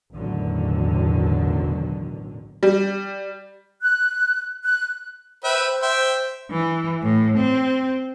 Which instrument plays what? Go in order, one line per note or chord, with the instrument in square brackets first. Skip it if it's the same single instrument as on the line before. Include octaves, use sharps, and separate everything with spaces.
[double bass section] A1 E2 B2 D3 D#3 F#3
[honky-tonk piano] G3
[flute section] F#6
F#6
[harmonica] B4 E5 G5 [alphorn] C5
[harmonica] E5 G5 C6
[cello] E3
A2
C4